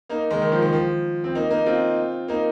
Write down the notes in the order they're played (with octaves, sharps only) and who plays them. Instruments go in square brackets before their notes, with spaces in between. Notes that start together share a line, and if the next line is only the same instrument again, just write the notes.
[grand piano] A#3 D#4
D#3 G#3
D#3
F3
D#3
F3
C4
A#3 D#4
A#3 D#4
C4 F4
A#3 D#4